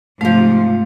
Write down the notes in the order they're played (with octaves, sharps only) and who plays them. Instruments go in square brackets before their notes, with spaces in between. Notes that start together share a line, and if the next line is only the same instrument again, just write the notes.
[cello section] G#2 C3 [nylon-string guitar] F3 F5 [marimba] A3